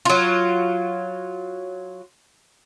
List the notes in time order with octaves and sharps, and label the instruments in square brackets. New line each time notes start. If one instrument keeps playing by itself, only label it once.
[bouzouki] F#3 F4